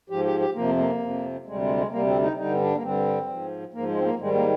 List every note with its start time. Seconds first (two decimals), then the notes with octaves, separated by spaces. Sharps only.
0.09 G#2 F3 G4
0.25 G4
0.40 G4
0.55 F2 C3 F3 A#3
0.78 A#3
1.00 F2 C3 F3
1.46 D2 C3 G3 G#3
1.62 G#3
1.77 G#3
1.91 D2 C3 G3 A#3
2.07 C4
2.22 D#4
2.37 G2 D3 G3 D#4
2.53 C4
2.60 D4
2.75 A#3
2.83 G2 D3 G3 C4
3.28 G#2 F3
3.74 G#2 F3 A#3
3.89 G#3
3.99 C4
4.04 A#3
4.19 G#2 D#3 G3 G#3
4.34 A#3